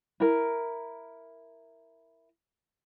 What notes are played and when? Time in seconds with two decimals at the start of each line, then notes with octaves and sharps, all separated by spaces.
0.20 E4 A#4